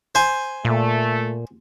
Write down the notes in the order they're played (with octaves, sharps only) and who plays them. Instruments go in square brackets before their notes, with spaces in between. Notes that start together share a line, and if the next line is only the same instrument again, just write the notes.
[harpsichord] C5 G#5
[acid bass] A#2 [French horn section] A3